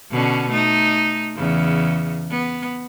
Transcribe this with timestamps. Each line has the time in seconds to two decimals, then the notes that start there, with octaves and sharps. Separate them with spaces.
0.12 B2 D3 C#4
0.51 A3 D#4
1.36 E2 C#3
2.31 B3